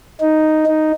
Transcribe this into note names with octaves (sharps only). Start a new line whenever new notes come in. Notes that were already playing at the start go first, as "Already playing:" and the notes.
D#4
D#4